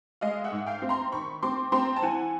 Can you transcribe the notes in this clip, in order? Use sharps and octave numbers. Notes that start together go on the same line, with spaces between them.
G#3 D#5 F5
E5 F#5
G#2
F5 G5
C4
A#5 C6
D#3 B5 C#6
C4 C6 D6
C4 A#5 C6
A5
E3 F#5 G#5